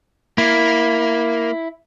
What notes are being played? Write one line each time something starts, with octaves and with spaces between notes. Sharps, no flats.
A#3 E4